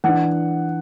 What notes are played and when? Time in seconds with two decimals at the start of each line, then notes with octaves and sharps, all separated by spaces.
0.04 E3 D4 F#5